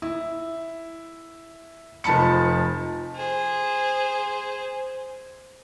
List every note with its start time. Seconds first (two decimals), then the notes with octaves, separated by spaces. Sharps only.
0.02 E4
2.04 F1 F3 A5 B5 C#7
3.15 G#4 C5